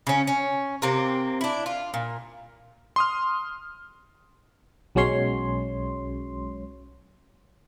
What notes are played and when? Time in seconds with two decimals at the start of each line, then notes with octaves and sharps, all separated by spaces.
0.07 C#3 C#4
0.27 C#4
0.82 C3 A#3 C4
1.41 D4 E4
1.66 F4
1.94 A#2
2.96 C6 D#6 F6
4.95 B1 F#3 G#3 C#4 C#5 C6